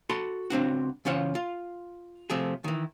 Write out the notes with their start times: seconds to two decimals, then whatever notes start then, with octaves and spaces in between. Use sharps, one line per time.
0.10 F#4 A4 B5 C6
0.50 C#2 C4 D4 F#4
1.05 C#3 E3 C#4 F4 C5 F#5
1.35 F4
2.30 C3 F3 A3 G#4
2.64 D#3 E3